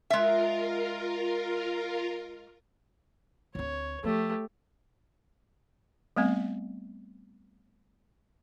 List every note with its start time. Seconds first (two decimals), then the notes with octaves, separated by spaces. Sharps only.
0.10 G#3 F4 A#4 E5
3.55 D2 C4 C#5
4.04 F3 A3 G4
6.17 G3 A3 B3 C4